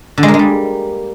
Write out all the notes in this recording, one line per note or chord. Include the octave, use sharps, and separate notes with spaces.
D3
G#3
A#3
G#3
G3